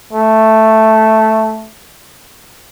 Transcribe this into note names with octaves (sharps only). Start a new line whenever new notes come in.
A3